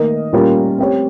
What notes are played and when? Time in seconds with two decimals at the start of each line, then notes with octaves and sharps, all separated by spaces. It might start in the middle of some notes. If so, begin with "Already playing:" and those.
Already playing: D#3 A#3 D#4 A#4 D#5
0.33 A#2 G3 C#4 F4 A#4
0.78 C4 G4 C#5